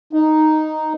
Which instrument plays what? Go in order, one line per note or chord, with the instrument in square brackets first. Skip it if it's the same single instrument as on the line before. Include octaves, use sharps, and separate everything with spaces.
[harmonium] D#4